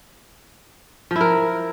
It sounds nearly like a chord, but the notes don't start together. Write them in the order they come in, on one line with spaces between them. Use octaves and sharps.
F3 E4 A#4